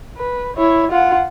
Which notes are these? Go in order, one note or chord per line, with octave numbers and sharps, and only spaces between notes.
B4
E4 C#5
F4 F#5